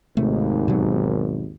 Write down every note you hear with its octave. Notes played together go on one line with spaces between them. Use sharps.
G#1 D#2 C3 A3
B2 F#3